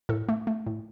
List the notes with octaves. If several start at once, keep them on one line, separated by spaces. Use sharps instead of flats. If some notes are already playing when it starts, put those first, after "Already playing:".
A2 A4
A3
A3
A2